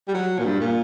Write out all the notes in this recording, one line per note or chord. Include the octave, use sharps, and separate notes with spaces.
G3
F#3
A#2
G2
A#2